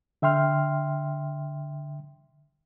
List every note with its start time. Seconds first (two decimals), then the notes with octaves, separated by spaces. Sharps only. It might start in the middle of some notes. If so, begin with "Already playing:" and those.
0.22 D3 E5 G5 C6 F6